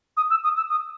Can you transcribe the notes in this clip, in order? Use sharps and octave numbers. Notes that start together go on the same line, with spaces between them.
D#6
E6
D#6
E6
D#6